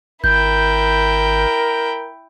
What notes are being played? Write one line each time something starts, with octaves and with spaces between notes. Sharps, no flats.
G#1 E4 A#4 G5 G6